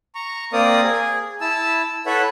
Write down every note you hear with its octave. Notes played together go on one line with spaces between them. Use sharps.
A#5 C#6
A#3 C4 A#4 D5 D#6
G#4
E4 A5 E6
E4 A4 B4 C#5 E5 F#5